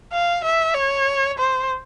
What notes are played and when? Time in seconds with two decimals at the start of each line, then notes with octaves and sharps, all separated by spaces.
0.13 F5
0.45 E5
0.75 C#5
1.38 C5